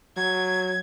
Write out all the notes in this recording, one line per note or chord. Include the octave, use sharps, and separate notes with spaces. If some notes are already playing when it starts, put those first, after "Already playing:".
F#3 G#6